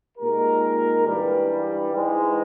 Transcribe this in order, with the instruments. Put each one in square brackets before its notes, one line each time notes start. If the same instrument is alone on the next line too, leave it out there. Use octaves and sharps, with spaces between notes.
[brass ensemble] A#2 G#3 D#4 G4 A#4
G2 E3 G3
G#2 E3 G#3